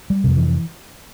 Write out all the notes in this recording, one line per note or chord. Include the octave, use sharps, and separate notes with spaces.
G3
F2 C3
E3